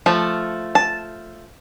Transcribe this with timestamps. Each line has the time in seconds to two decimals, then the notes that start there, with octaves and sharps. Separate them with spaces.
0.06 F3 A3
0.75 A5